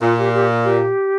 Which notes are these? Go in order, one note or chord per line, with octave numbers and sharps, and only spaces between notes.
A#2 F4
G4
G4
G4